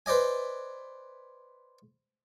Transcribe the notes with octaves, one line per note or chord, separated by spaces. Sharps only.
B4 C5 D5 D#5 G#5